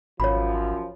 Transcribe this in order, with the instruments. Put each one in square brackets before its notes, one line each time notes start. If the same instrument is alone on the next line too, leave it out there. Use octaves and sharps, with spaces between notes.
[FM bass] G#1 [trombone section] F#2 F3 [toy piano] C#5 B5